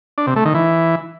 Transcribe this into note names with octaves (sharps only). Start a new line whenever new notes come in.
D4
C3
A3
D#3
E3